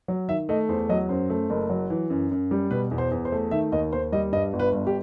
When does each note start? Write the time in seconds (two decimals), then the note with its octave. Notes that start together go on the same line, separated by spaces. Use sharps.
0.08 F#3
0.28 D#3 E5
0.49 A3 D#5
0.69 E2 C5
0.89 F#3 D#5
1.09 F#2 C5
1.30 A3
1.50 F#1
1.70 F#3
1.90 E3
2.10 F#2
2.31 F#2
2.51 G3
2.71 B2 B4
2.91 E2
2.98 C5
3.11 E2
3.25 C5
3.32 A3
3.51 D#3 E5
3.72 D#2 D#5
3.93 D#2 C5
4.12 G3 D#5
4.32 G2 D#5
4.53 G1
4.59 B4
4.72 G1
4.87 G4